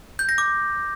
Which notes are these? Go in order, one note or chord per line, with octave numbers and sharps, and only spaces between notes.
G6
A#6
D6